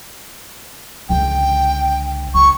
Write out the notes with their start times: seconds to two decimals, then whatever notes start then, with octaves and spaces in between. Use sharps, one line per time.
1.09 C#2 D3 G5
2.34 C#2 C#6